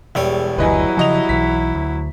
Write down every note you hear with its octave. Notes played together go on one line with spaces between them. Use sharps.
E1 E2 G3 C#5
F#1 D2 F#3 E4 B4 D#5 G#5
C#3 F3 F#4 D#5 F7
B1 B2 E3 B6
D2